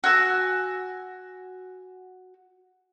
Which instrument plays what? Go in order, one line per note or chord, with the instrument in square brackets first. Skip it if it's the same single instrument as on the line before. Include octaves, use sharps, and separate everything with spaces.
[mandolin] F#4 G#5 E6